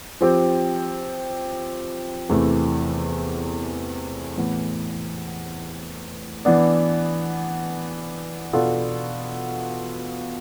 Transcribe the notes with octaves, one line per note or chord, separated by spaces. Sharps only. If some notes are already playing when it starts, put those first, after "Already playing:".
F3 C4 G4
E2 C3 E3 A3 E4
A2 E3 B3
E3 B3 D4
B2 B3 D4 F4 A4